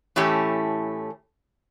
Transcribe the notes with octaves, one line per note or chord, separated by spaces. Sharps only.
A2 E3 A3 C#4 G4